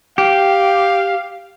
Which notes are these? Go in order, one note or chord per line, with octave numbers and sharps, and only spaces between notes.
G4 F5